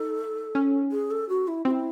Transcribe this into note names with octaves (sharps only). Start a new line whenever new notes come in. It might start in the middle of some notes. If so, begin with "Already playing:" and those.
Already playing: D#4 A4
C#4
G#4
A4
F#4
E4
C4 F#4
E4